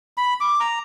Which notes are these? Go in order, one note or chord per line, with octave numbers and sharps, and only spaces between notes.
B5
D6
A#5